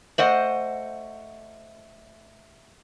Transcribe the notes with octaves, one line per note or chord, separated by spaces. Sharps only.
A3 C5 D#5 F#5